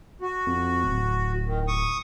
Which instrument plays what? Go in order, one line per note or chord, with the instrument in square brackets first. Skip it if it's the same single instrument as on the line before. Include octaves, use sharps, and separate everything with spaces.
[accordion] F#4
[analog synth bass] F2
D1
[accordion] D#3
C#6 D#6